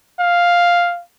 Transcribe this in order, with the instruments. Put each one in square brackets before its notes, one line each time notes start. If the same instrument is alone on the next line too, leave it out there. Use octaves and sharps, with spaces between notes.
[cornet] F5